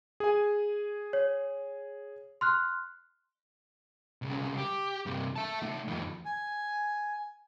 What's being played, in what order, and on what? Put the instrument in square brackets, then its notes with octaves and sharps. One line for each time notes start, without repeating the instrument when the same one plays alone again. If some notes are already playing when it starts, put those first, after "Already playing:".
[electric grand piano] G#4 G#5
[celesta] C#5
C6 F6 F#6
[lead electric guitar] C2 C#3
G4
G2 C3
E5 A5
A3 D#4
F2 D#3
[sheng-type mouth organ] G#5